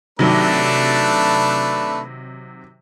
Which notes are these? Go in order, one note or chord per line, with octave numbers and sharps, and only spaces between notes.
C3 D#3 F#3 A3 D4 B4